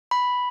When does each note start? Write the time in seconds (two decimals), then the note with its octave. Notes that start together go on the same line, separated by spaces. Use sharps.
0.11 B5